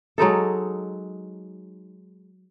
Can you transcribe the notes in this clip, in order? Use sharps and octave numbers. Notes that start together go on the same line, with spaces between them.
F#3 G#3 D#4 A4